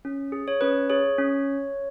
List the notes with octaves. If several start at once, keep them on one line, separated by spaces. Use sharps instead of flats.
C#4
G#4
C#5
C#4 B4
G#4 C#5
C#4